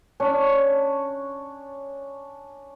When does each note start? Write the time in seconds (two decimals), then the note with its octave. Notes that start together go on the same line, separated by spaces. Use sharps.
0.20 C#4 D4 C#5